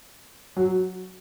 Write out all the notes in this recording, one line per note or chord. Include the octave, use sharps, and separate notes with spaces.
F#3